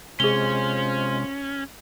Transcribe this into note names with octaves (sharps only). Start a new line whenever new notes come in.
C3 G#3 C#4 F4 G#4 C5 G7